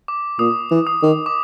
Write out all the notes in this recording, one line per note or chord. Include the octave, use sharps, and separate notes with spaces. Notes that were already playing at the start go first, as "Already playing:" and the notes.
D6
A#2 D#6
E3
D#6
D#3
D6